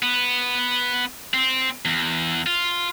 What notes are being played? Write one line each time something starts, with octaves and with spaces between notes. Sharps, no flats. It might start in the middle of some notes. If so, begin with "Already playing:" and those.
B3
C4
E2
F4